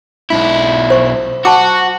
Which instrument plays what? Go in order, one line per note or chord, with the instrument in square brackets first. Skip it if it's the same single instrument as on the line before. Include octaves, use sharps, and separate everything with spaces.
[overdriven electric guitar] B1 E4
[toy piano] C5 C#6
[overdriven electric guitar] F#4 [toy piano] A5 D6